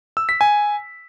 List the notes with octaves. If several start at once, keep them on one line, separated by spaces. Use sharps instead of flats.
E6
B6
G#5